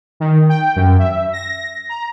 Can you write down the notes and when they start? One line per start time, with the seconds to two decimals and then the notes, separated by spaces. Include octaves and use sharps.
0.20 D#3
0.49 G5
0.76 F#2
0.99 E5
1.33 A#6
1.89 A#5